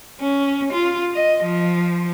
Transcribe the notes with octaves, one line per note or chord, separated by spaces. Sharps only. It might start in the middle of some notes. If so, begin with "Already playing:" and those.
C#4
F4
D#5
F3